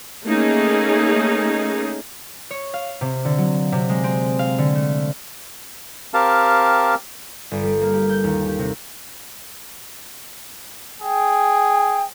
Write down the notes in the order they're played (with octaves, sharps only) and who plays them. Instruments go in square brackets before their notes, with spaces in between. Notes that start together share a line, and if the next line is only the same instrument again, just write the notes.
[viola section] A3 A#3 C#4 D#4 G#4
[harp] C#5
F5
C3
D3
F#3
C3
G#3
C4
F5
D3
A3
[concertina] C4 G4 A#4 F5 A5
[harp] G1
G3
A#3
G4
G6
D#2
G4
C3
[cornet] G#4 [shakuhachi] G5